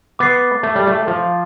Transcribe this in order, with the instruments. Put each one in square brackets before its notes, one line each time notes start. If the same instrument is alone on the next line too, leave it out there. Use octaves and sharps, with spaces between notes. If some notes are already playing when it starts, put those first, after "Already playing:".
[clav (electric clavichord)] B3 [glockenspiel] D6 A6 C7
[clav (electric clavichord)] A3
G3
A3
F3